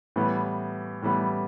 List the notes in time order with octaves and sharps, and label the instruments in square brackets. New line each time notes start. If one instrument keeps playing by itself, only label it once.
[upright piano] A2 E3 G3 B3
A2 E3 G3 B3